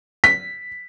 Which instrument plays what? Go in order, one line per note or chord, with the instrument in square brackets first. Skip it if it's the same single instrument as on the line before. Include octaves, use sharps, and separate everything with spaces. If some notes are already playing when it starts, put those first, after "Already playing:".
[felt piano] B6